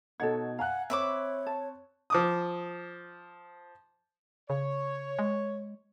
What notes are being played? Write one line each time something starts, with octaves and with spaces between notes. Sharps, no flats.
B2 D#4 A4 C#5 F#5 G#6
F5 F#5 G#5 A#5 F#6
C4 C#5 E5 B5 C#6 D6
A5
F3 D6 D#6
C#3 C#5
G#3